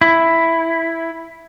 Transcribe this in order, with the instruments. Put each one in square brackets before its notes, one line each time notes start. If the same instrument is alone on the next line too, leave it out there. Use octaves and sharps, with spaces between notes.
[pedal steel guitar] E4